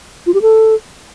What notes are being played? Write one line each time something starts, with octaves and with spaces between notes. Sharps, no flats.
F4
G4
A4